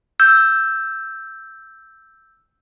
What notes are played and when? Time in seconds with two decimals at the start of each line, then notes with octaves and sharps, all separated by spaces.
0.20 E6 G6